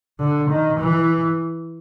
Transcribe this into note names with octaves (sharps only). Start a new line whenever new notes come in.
D3
D#3
E3